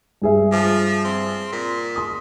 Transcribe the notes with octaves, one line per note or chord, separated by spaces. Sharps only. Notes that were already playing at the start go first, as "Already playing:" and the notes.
G2 G#4 E5
F3
C4
A#2
C6 D#6